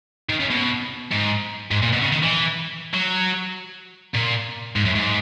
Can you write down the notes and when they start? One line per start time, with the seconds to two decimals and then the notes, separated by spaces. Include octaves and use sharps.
0.30 D#3
0.40 C#3
0.50 B2
1.11 G#2
1.71 G#2
1.82 A#2
1.93 B2
2.02 C#3
2.12 D#3
2.23 E3
2.94 F#3
4.14 A#2
4.76 G#2
4.85 F#2
4.95 G#2